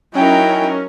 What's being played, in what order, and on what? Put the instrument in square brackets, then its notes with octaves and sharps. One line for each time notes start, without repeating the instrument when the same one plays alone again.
[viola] F#3 A#4 [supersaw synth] C#4 [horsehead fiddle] D#4 E4 [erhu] G5